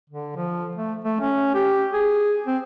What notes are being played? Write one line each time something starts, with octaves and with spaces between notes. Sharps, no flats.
D3
F3
A3
A3
C#4
G4
G#4
C4